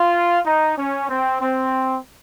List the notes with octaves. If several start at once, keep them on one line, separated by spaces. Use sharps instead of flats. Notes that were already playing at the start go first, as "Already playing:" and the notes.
Already playing: F4
D#4
C#4
C4
C4